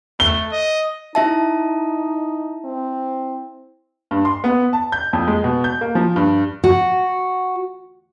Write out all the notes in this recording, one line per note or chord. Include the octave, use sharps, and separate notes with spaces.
A3 G7
D#5
D#4 E4 E5 A5
C4
G2
C6
B3
A5
G6
F2
G#3
B2
G6
A#3
F3
G2
F#4